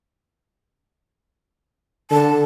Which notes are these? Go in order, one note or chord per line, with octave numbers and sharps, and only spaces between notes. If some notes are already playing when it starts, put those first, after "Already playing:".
D3 A5